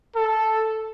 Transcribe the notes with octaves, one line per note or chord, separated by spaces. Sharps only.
A4